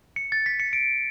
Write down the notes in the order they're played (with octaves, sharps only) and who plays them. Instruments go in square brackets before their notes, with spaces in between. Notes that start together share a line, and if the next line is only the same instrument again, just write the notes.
[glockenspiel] C#7
A6
B6
C#7
D7